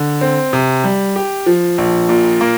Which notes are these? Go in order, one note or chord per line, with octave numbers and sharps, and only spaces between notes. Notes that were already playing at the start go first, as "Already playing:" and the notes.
Already playing: D3
C4
C3
G3
G4
F3
A#1
A#2
A#3